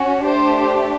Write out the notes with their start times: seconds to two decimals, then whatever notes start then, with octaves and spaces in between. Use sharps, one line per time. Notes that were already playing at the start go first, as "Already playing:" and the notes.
Already playing: C#4 F#4
0.25 A3 D4 G4 C5